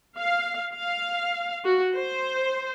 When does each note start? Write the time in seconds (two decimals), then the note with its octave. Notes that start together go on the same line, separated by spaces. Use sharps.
0.18 F5
0.73 F5
1.64 F#4
1.95 C5